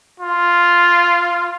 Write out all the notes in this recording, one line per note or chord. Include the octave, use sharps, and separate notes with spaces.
F4